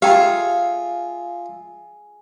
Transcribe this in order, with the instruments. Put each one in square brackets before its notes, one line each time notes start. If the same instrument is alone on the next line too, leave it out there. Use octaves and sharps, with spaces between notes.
[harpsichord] F4 E5 [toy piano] G4 G5 A#5 [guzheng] G#4 F5